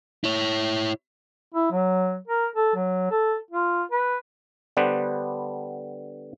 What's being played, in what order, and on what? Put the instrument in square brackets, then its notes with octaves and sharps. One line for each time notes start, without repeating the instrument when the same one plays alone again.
[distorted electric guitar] E4 C#5
[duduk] E4
F#3
A#4
A4
F#3
A4
F4
B4
[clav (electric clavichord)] D3 G3 B3 D4 B4 C5